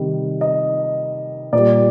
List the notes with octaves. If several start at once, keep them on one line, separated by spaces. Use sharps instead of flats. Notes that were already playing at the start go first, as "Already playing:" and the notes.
Already playing: C3 D#3 G3
D#5
A#2 G3 D5